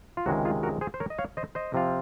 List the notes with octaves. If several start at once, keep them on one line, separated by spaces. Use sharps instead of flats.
F4
C#2 C3 D#3 G#3 F#4
F4 G#4
F#4 A#4
G#4 C5
C5
A#4 C#5
D#5
C#5 F5
C5 D#5
C5 D#5
C3 F3 C4 F4